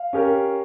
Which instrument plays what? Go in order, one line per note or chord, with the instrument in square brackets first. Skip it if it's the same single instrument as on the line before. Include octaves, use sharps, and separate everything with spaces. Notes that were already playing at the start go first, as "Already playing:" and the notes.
Already playing: [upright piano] F5
[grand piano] C#4 G4 A#4